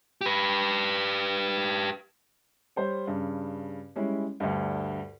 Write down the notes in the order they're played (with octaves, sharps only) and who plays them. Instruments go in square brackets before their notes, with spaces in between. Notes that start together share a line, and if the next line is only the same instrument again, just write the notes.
[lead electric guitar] G4 B4
[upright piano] G3 C5 C#5
G2 C#3
G3 G#3 C#4 E4
D2 G2